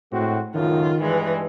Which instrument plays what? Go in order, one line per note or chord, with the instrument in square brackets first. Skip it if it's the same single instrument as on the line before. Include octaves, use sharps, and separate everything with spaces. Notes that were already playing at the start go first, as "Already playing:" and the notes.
[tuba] A2 [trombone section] G#3 C4 F#4
[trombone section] C#2 F#2 A2 [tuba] D#3 [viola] F4
[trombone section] G2 G#3 [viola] E3